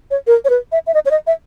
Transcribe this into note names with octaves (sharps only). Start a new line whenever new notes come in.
C#5
A#4
C#5
B4
E5
E5
D#5
C#5
D#5
E5